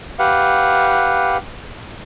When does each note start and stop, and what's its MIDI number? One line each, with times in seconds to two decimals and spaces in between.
0.19 1.37 67
0.19 1.37 71
0.19 1.37 77
0.19 1.37 78